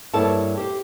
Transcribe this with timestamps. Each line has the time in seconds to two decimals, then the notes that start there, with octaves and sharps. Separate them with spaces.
0.14 G2 A#3 E4 A4 C#5 A5
0.57 G4 C5